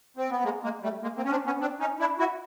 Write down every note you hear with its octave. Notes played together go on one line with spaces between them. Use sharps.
C4
B3
G#3 A#3
G#3 A#3
G3 A3
G#3 A#3
A#3 C4
C#4
C4 D4
B3 C#4
C4 D4
C#4 D#4
D4 E4
E4 F#4